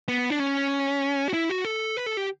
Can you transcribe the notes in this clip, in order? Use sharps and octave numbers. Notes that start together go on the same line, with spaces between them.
B3
D4
C#4
F#4
E4
F#4
A4
B4
A4
G4